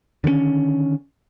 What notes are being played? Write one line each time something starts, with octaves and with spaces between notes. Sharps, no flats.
D3 D#3 G3 C#4